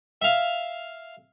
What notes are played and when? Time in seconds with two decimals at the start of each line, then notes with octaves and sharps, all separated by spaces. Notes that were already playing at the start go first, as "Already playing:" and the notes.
0.22 E5 F5